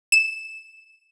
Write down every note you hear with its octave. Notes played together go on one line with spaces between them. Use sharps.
E7